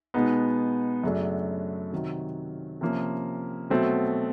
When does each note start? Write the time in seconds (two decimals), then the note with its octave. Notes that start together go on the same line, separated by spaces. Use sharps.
0.14 B2 G#3 B3 D#4
1.04 F#2 C#3 F#3 A3 D4
1.92 C3 D#3 F#3
2.81 C3 F3 A#3 C#4
3.70 B2 F#3 A3 C4